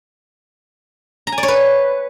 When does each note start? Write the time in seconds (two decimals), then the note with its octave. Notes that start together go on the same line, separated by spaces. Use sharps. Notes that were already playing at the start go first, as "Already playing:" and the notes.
1.27 A#5
1.32 G#5
1.38 D5
1.43 C#5
1.48 B4